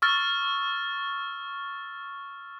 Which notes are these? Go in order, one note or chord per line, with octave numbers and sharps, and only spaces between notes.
C#6 E6 F6 A6